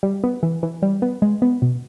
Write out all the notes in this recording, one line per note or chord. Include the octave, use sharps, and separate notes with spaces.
G3
B3
E3
E3
G3
B3
G#3
B3
B2